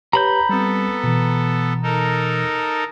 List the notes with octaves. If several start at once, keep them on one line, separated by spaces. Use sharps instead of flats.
G4 B4 C#5 A#5 B5 G6
G3 B3 C4 A4
B2 E3
D#4 A4 A#4